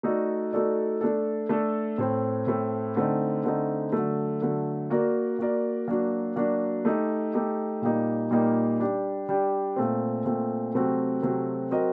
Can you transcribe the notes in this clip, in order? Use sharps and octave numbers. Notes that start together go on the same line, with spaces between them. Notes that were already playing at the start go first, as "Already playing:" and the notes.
A3 D#4 F#4 A4 D5
A3 D#4 F#4 A4 D5
A3 D4 A4
A3 D4 A4
A2 A3 C4
A2 A3 C4
D3 A3 C4 D#4
D3 A3 C4 D#4
D3 F#3 A3
D3 F#3 A3
A#3 F#4 A#4 D5
A#3 F#4 A#4 D5
F#3 A#3 D4 F#4
F#3 A#3 D4 F#4
A3 D#4 G4
A3 D#4 G4
A#2 G3 A#3 D#4
A#2 G3 A#3 D#4
G3 D4 G4
G3 D4 G4
A#2 A3 C4
A#2 A3 C4
C3 F#3 A3 C4 F#4
C3 F#3 A3 C4 F#4
F#3 C4 F#4 A#4 D#5